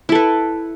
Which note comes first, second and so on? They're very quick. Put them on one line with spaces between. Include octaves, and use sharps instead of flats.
E4 A4 B4